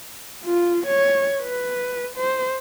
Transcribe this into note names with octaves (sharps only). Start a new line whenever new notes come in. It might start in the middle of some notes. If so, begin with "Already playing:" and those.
F4
C#5
B4
C5